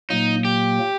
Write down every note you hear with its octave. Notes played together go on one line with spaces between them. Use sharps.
A#2 F#3 A#3 D#4
G4